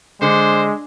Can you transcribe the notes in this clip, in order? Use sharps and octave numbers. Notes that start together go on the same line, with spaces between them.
D3 G#3 C5